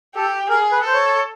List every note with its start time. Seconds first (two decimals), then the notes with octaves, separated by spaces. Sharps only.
0.15 G4 A4
0.49 G#4 A#4
0.72 B4
0.83 A4 C5
0.93 C#5